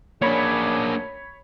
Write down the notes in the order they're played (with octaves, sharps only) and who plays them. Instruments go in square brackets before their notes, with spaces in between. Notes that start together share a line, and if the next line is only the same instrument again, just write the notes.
[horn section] F#2 G#4 D5 [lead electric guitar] A#3 D4 [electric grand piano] C#5 B5